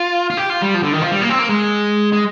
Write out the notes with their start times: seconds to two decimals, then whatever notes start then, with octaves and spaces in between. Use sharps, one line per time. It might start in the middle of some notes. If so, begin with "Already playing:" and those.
Already playing: F4
0.30 F4
0.37 G4
0.50 F4
0.62 G3
0.74 F3
0.83 D3
0.93 D#3
1.01 F3
1.12 G3
1.21 A#3
1.30 C4
1.39 A#3
1.49 G#3
2.13 G#3